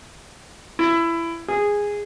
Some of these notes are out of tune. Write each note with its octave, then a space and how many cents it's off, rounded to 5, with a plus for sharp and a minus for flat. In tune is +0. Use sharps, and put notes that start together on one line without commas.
E4 +20
G#4 -10